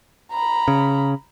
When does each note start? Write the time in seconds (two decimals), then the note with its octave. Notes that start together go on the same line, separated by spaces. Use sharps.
0.31 A#5 B5
0.68 C#3